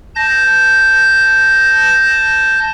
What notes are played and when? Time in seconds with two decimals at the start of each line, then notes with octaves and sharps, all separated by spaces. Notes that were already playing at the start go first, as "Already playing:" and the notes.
0.15 A5 G6 A#6